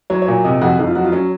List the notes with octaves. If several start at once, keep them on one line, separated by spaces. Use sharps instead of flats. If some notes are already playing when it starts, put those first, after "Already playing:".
F#3 C#5
C#5
A#2
C3 D#5
F2 F#4
F2 D#4
F4
F#3 F#4
F4
F#3 C#4